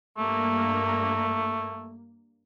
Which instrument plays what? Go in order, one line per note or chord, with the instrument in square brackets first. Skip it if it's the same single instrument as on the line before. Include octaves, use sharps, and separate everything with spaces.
[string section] G2 A#3 [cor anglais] A3